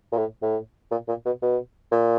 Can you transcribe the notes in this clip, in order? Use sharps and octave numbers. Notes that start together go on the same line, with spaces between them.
A#2
A2
A2
A#2
A#2
B2
B2
A#2